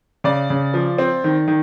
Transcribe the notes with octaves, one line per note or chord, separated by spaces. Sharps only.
C#3 D5
C#3
F3
C4
D#3
D#3